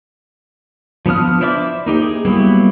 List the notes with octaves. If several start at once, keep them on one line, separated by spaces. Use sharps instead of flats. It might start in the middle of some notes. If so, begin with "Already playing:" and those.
F3 B3 D4 D#6 F6
E4 C5 D5 E5 D6
A#3 D#4 G4
G#4
F#3 G3 A#3 B3 E4